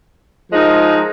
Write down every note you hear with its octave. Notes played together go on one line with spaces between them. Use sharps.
F3 G#3 D#4 A#4